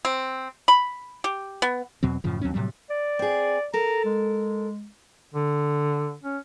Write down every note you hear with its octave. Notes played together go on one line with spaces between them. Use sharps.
C4
B5
G4
B3
E2 B2 F#3 C4
F#2 A2 C#3 F3
D#2 F#3 C4 C#4
A2 C3 F#3 G3
D5
C4 G#4
A4 A#4 A#5
G#3
D3
C#4